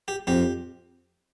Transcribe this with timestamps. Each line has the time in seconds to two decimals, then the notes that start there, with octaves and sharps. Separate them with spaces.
0.08 G4
0.27 F2 G4